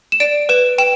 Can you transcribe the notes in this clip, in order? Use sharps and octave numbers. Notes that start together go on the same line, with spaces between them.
E7
D5 D7
B4 E7
G5 E7